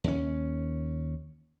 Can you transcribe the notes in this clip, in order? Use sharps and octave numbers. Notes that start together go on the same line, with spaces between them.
D#2 C#4